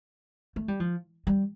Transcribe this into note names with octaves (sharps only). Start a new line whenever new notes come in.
A3
G3
F3
G3